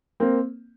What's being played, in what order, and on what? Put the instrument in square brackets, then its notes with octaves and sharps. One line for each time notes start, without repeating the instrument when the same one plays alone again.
[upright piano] A#3 C4